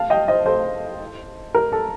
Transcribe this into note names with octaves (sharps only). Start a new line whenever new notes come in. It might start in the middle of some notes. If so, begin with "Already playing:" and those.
Already playing: F5 A5
D#5 G5
C5 D#5
A4 C5
A#4
A4